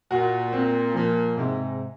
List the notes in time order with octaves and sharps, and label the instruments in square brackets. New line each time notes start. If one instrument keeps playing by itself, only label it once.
[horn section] A#2 [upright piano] F#4
[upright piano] C4
[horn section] A#2 [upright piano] F3
[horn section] G#2 [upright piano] C3